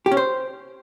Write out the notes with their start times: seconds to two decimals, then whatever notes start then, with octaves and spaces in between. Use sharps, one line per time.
0.06 G4
0.12 C#4
0.17 C5